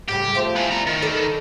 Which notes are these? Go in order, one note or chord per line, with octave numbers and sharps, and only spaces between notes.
A2 C#3 G3 G4
F3 A3 C4
E3 B3
D5 A#5
D#3
A4 B4 D5